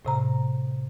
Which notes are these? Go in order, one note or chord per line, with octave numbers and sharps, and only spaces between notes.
A2 C3 A#5